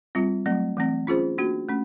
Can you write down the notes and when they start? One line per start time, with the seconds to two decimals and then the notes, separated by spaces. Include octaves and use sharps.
0.15 G3 C4 F4
0.46 F#3 A3 C4
0.77 E3 A3 C4
1.07 C#4 F4 G#4 C5
1.38 A#3 D4 F#4
1.69 A3 C#4